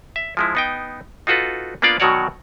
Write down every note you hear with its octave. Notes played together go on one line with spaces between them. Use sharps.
E5
F3 G#3 E4
B3 D#4 G5
D#4 F4 F#4 A4 B4
A#3 B3 D4 F4 D5 F5
B2 D#3 F#3 F#4 C#5 D5